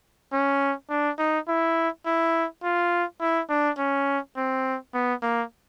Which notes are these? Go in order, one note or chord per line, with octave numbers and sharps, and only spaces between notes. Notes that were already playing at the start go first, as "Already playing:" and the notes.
C#4
D4
D#4
E4
E4
F4
E4
D4
C#4
C4
B3
A#3